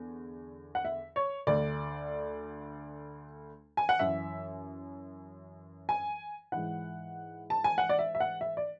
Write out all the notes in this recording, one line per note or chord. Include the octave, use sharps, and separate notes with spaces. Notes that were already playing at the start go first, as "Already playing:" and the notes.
Already playing: E2 D3
F#5
E5
C#5
D2 D3 D5
G#5
F#5
F#2 E3 E5
G#5
G#2 E3 F#5
A5
G#5
F#5
D5
E5
E5
F#5
E5
D5